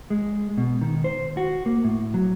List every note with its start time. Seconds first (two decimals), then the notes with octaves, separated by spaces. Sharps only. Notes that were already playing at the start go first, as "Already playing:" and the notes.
0.10 G#3
0.57 B2
0.82 D#3
1.04 C5
1.37 F#4
1.66 A#3
1.84 A2
2.14 F#3